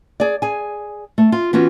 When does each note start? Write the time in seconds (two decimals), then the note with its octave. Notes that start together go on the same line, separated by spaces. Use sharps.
0.20 G#4 D5
0.42 G#4 G#5
1.18 A3
1.32 F4
1.53 E3 B3 C#4 F4 F#4